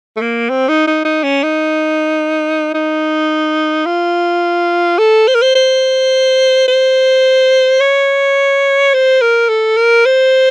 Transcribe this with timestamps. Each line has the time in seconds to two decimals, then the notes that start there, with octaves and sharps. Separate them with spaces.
0.16 A3
0.21 A#3
0.49 C4
0.68 D#4
0.87 D#4
1.05 D#4
1.23 C#4
1.43 D#4
2.74 D#4
3.86 F4
4.99 A4
5.28 C5
5.35 A#4
5.42 C5
5.55 C5
6.68 C5
7.80 C#5
8.94 C5
9.22 A#4
9.49 A4
9.77 A#4
10.06 C5